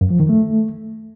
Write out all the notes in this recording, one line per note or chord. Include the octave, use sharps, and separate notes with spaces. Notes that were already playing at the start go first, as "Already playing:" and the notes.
F#2
F3
D#3
A3